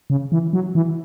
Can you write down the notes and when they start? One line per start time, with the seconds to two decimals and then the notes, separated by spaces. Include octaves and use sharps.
0.10 C#3
0.32 E3
0.53 F#3
0.75 E3